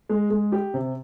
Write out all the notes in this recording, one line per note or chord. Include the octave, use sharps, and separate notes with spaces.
G#3
G#3
G4
C3